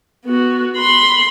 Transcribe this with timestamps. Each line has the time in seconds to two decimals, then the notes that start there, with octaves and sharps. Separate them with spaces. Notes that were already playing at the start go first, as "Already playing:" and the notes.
0.25 B3 F#4
0.77 B5 C6